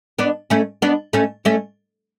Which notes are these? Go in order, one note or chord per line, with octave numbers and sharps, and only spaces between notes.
B3 D4
A3 C#4
B3 D4
A3 C#4
A3 C#4